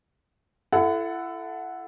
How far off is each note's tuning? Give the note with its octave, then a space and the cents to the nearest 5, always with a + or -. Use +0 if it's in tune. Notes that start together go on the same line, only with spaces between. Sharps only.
E4 +35 A4 +0 F#5 +0